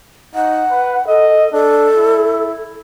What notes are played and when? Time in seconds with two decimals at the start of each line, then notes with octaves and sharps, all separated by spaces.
0.35 D#4 F#5
0.71 B4
1.08 A4 D#5
1.53 D4 A4
1.97 E4